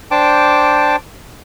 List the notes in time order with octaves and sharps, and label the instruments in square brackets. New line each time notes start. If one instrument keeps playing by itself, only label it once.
[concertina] D4 C5 G5 A5 D6